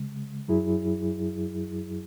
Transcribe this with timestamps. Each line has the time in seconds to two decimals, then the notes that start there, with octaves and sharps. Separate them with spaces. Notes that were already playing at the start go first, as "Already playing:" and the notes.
Already playing: C#3 G#3
0.48 F#2 F#3 E4 G#4